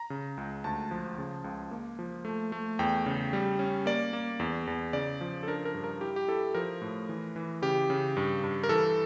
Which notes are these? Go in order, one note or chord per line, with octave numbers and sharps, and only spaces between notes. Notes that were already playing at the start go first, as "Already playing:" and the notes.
Already playing: A#5
C#3
C#2
D2 A5
F3
C#3
C#2
A#3
F3
A3
A3
E2 G5
C#3
G3
C#4
A#3 D5
A#3
E2
E2
C#3 D5
F3
A4
D4 A#4
A#4
G2
A#4
E4 G4
G4
E4 A4
F3 A#4
A2
E3
E3
C#3 G4
C#3
G2
G2
A#4
E3 A4